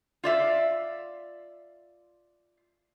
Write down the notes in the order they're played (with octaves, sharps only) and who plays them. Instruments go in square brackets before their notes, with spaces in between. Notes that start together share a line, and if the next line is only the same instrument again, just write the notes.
[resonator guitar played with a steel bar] F4 D5 E5